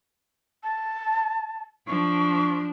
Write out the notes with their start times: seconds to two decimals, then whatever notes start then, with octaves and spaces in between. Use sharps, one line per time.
0.63 A5
1.87 F3 D4 C#6